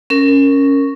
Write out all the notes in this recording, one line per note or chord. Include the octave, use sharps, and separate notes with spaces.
C#4 A#4